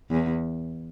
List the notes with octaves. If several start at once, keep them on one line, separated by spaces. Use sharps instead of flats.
E2